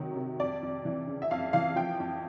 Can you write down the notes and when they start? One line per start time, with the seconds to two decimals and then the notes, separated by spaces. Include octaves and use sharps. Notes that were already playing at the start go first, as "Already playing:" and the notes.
Already playing: C3 D#3 F#3
0.16 C3
0.40 F2 D5
0.63 F2
0.85 E3
1.07 C#3
1.22 E5
1.31 F2 F5
1.53 E3 F5
1.76 F3 G5
2.00 F2